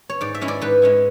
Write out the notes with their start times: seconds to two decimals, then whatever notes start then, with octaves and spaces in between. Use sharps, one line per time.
0.10 C#5
0.21 G#2 D5
0.34 E5
0.41 G#3 C#4 E4
0.48 D5
0.61 G#2 B4
0.82 G#3 C#4 E4